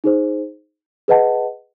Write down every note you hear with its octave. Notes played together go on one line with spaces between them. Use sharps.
D#4 G#4 C5
G#4 B4 D#5 F#5 A5